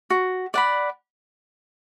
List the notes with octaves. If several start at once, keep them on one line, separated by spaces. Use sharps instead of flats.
F#4
D5 F#5 B5